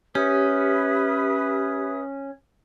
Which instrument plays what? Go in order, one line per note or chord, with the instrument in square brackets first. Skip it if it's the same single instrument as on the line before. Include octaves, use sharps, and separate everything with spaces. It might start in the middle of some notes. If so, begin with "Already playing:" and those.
[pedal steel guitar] C#4 [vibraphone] G4 [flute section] B4 E5 D#6